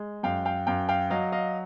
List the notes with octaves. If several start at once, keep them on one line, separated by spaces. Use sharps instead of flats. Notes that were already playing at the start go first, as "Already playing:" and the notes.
Already playing: G#3
F#2 F5 G5
F5 G5
F#2 F5 G5
F5 G5
F#3 D#5 F5
D#5 F5